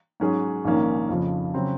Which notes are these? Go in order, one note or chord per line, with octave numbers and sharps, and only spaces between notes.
G#2 F#3 C#4 G#4
A#1 G#2 D#3 A#3 C#4
F2 C#3 F3
C#3 F#3 C4